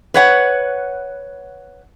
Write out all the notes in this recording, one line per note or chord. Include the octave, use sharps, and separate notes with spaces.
B4 C#5 F#5